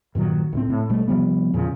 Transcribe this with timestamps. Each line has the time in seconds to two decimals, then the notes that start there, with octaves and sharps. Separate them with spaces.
0.15 G2 A#2 D#3 F#3
0.53 C#2 A2 C4
0.70 A2
0.89 A#1 B2 G3 A3
1.08 C3 F3 G3 B3
1.53 E2 A#2 C#3 F3